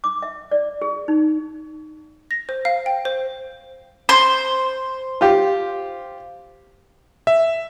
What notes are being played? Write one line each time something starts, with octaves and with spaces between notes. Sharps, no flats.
D6
E5
D5
G#4
D#4
A#6
C5
F5
G5
C5
C5
F4 G4
E5